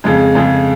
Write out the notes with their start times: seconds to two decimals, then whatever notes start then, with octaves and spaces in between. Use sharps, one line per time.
0.04 F2 C#3 G#3
0.35 F2 C#3 G#3